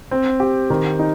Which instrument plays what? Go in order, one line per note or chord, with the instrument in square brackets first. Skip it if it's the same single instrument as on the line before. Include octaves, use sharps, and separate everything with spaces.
[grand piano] C4
G4
D#3
D#4